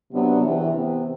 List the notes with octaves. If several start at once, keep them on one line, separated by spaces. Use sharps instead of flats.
C3 F#3 B3 D4
E2 C3 E3
C3 E3 B3